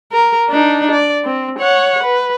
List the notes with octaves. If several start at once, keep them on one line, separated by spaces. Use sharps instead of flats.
A#4
D4 D#4
D5
C4
C#5 F#5
B4